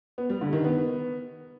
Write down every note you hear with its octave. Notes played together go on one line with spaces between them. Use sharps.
B3
G3
D3
D#3
B3